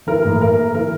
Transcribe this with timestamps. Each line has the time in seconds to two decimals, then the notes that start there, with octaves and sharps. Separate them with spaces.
0.07 E3 A#4
0.24 A2
0.40 A#3 A#4
0.58 A#3
0.74 E3 A#4